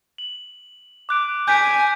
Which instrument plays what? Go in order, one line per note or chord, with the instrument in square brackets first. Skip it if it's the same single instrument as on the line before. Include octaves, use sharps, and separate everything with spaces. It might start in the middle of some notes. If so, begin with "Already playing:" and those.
[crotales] F#7
D6 F#6 D7
[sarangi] G#5 [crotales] G6 B6 D7